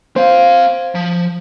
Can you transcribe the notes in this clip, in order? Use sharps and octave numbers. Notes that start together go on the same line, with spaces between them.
C4 C5 F5
F3